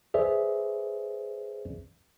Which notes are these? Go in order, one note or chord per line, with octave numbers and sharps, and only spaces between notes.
G#4 B4 C5 D5 E5